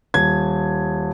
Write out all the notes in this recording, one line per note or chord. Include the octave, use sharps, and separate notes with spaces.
D#1 G#6